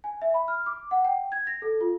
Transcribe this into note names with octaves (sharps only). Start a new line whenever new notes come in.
G#5
E5
B5
F6
D6
F#5
G5
G#6
A#6
A4
F4